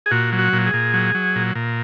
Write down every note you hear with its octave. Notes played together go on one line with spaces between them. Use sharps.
G#4
A#2 F#4
F#3
F#4
A#2
G#4
A#2
F#3
F#3
A#2
A#2